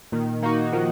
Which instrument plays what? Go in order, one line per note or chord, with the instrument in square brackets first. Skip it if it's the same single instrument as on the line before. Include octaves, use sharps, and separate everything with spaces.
[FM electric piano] A#2 [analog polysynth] D#3
[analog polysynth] A#3 D#4 F#4
[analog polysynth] D#3 [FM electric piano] F3